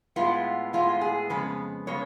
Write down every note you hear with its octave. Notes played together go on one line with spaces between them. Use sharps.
A2 G#3 B3 F4
A2 G#3 B3 F4
G#4
F2 C#3 G#3 B3 B4
C#3 G#3 B3 C#5